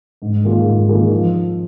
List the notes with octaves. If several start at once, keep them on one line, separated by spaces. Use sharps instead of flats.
G#2
D#3 A#3 F4 G#4
G#2
D#3 A#3 F4 G#4
F3